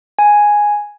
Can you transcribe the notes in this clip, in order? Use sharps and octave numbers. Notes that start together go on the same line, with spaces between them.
G#5